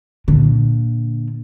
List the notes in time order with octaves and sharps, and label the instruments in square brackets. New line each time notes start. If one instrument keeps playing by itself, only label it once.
[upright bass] A#2 D3